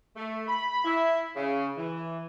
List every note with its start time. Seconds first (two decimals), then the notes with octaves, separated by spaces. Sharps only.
0.16 A3
0.48 B5
0.84 E4
1.36 C#3
1.77 E3